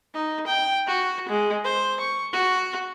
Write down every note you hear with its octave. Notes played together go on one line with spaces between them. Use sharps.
D#4
G5
F#4
G#3
C5
C#6
F#4